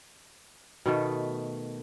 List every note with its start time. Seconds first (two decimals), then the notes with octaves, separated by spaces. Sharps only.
0.86 B2 D#3 A3